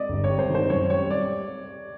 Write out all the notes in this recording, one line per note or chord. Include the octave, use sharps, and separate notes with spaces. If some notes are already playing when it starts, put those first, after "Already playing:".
Already playing: D5 D#5
G1
C#5
G3
C5
D#3
C5
F#2 C#5
G3 C#5
G3 D5